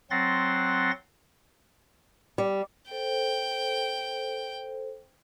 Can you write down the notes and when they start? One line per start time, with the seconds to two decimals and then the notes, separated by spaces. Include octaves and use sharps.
0.10 F#3 C4 F#5 C6 A6 A#6
2.38 G3
2.91 A4 C5 G5